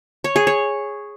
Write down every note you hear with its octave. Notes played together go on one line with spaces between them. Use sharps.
C#5
G#4
C#5